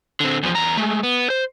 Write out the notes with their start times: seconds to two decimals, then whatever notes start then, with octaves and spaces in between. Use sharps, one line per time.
0.20 D3 C4
0.43 E2 F3
0.55 E2 A#5
0.77 G#3 A3
1.03 B3
1.30 C5